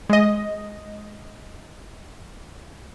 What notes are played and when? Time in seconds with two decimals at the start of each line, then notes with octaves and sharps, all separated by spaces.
0.09 G#3 D#5